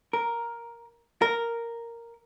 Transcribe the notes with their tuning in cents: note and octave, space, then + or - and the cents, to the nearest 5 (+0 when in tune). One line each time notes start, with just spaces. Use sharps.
A#4 +5
A#4 -5